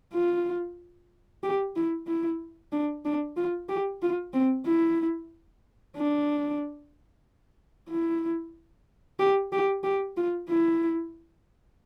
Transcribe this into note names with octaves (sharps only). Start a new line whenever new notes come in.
F4
G4
E4
E4
D4
D4
F4
G4
F4
C4
E4
D4
E4
G4
G4
G4
F4
E4